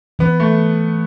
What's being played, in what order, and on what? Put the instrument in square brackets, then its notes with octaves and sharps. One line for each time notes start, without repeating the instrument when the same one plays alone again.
[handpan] E3 [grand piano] B3
[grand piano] A3